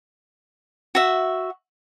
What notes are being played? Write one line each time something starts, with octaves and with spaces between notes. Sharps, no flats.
F#4 E5